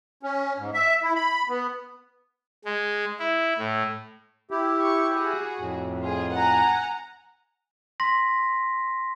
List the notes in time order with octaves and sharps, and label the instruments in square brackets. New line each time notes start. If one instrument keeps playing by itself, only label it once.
[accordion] C#4
G#2
E5
E4
B5
B3
[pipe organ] G#3
E4
A2
[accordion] E4 G4
[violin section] C#6
F#4 G#4
[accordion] F2 A2
[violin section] F4 G#4
F#5 G#5 A#5
[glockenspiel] C6 A#6 B6